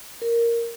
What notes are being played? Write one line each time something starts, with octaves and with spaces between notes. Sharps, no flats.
A#4